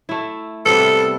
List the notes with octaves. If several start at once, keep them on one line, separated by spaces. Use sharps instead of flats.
A3 E4
C3 G3 B3 A4